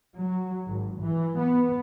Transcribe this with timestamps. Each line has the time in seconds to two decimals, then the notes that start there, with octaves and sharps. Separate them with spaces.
0.18 F#3
0.67 G#1
1.01 E3
1.38 B3